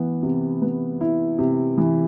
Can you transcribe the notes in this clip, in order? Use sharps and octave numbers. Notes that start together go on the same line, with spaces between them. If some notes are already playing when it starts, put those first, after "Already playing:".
Already playing: E3 B3
C3
B3
E4
C3
E3